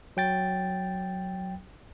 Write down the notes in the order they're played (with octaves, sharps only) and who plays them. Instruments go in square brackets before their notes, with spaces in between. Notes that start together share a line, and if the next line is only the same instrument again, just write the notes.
[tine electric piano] F#3 G5 A6